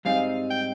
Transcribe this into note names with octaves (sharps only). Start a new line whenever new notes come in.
G#2 G3 C4 D#4 G#4 F5
G5